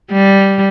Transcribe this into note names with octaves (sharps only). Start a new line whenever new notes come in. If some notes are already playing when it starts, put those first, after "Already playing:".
G3